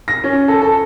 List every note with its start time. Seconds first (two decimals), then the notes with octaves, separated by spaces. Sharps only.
0.08 A#6
0.24 C#4
0.48 A4
0.62 A4